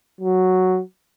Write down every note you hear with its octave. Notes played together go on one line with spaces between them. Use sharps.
F#3